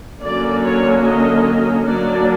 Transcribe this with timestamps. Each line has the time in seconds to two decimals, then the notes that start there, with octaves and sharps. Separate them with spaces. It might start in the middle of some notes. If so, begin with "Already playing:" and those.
0.21 D3 F#3 A#3 C#4 D5
0.64 C#5
1.04 D#5
1.87 F#3 A#3 D4 D5